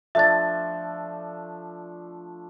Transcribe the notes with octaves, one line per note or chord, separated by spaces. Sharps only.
F3 A3 D4 E5 A6